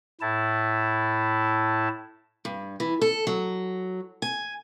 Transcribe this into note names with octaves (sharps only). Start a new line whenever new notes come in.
A2 E4 A5
G2
E3
A4
F#3
G#5